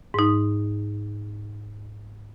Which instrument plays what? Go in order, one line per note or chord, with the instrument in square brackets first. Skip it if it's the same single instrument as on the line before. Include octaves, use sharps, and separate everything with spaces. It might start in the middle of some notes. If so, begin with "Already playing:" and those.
[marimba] G#2 D#4